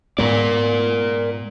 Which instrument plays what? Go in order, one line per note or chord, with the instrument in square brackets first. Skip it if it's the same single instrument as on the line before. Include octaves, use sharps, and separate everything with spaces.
[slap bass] G#2 G#3 B3 [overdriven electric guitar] A#4 D5